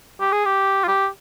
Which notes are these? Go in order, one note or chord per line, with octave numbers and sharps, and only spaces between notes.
G4
G#4
G4
F4
G4